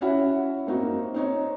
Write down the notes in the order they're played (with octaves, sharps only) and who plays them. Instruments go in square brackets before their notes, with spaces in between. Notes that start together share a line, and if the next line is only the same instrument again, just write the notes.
[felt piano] C#4 E4 F#4 C#5 E5 F#5
A#3 C4 D#4 F#4
C4 D#4 C#5